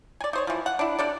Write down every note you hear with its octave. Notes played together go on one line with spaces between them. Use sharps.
D5 G#5
D#4 C5 C#5
E3 F3
F#5
D4 E4
C3 D4 A4 D5